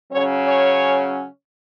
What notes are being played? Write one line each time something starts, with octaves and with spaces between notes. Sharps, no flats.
C#3 F#3 C#4 C#5
C#5